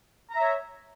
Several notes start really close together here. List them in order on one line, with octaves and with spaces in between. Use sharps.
A#5 E5 C#5